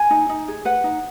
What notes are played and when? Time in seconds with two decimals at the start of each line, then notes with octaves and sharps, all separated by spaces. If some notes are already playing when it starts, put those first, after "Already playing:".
Already playing: G#5
0.10 D#4
0.29 D#4
0.48 G#4
0.65 B4 F#5
0.84 D#4